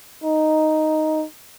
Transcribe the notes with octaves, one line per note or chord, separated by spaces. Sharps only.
D#4